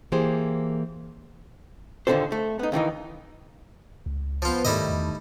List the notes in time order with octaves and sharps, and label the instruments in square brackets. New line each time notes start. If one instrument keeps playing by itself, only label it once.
[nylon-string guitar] E3 A#3 G4 G#4 C5
[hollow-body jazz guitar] D#2 A#2 D3 E3 A4 C5
A3
B3 D#4
D#2 D#3 E3 D#4
[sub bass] C#2
[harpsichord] F3 F4 [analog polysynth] B3 B4 C5
[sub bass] G#2 [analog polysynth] D#3 A3 [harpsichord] G3 E4 D#5
[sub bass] E2